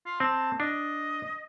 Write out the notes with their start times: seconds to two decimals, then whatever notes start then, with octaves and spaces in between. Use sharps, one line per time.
0.06 F4
0.20 C4 A5
0.60 D4 D#5